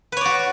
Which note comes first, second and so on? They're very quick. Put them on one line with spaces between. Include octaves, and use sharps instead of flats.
B4 C#5 D5 F#4